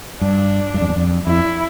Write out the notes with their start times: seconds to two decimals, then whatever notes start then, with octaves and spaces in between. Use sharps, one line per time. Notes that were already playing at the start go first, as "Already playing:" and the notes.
0.21 G2 D4
0.74 G2
0.81 F2
0.89 E2
0.96 F2
1.26 F2 E4